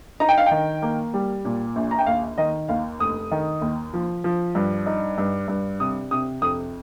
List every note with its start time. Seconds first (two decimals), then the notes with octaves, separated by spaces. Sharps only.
0.20 D#4 A#5
0.29 G5
0.38 F5
0.46 D#3 G5
0.82 A#3
1.14 G3
1.45 A#2
1.76 A#1
1.91 A#5
1.99 G5
2.06 D#2 F5
2.38 D#3 D#5
2.69 D#2 F5
3.00 F1 D#6
3.31 D#3
3.62 D#2
3.94 F3
4.24 F3
4.55 G2
4.86 D#4
5.18 G2
5.48 G2
5.80 C3 D#6
6.11 C3 D#6
6.42 F2 D#6